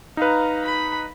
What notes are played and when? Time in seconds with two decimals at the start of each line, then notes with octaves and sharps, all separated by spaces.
0.17 D#4 B4 F5 A#5
0.64 B5